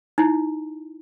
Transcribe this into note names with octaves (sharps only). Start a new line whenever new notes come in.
D#4 E4